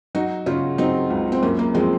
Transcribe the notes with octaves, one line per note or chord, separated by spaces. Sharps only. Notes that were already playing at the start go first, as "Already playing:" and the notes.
F#3 D#4 F#4
C#3 C#4 F4
F#3 C4 D#4
C#2
C4
F#2 A#3 C#4
A#3
F3 G#3 C4